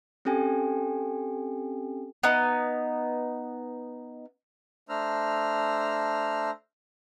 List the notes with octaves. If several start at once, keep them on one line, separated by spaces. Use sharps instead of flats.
C4 C#4 G4 A4 G5 G#5
B3 D#4
A3 D4 C5 A#5 E6 F6